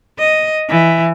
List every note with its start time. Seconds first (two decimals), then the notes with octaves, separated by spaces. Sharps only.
0.19 D#5
0.70 E3